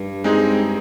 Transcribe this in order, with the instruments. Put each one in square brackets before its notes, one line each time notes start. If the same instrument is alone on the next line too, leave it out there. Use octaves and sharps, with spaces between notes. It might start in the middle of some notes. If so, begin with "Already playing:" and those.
Already playing: [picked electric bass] G2
[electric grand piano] G#3 C4 D#4 G#4